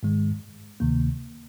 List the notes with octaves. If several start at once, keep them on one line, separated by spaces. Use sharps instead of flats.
G#2 D#3 G#3
D2 C3 D#3 A#3